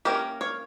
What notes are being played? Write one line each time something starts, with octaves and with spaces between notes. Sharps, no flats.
E3 A#3 C#4 G4 A#4
C#5 F5